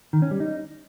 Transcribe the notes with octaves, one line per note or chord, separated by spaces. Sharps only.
D#3
C#4
G3
D#4